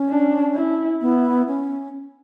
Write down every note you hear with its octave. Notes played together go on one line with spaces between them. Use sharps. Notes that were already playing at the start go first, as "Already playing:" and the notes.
Already playing: C#4
D4
E4
B3 E4
C#4